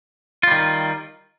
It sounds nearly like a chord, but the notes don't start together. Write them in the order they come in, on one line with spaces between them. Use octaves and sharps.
F4 G3 D#3